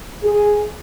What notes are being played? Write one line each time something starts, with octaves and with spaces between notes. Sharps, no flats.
G#4